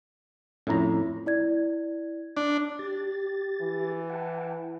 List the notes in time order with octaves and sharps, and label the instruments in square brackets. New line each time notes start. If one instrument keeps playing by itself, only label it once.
[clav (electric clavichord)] F2 A2 [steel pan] C#4 E4 A#5
[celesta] E4 D5 G#6
[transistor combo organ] D4
[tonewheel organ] G4 A6
[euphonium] E3
[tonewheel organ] F#5 G5 A5